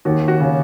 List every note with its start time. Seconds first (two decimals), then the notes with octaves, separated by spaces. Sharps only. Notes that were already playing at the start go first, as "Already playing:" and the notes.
0.05 D#2 F#4
0.28 F#4
0.40 C#3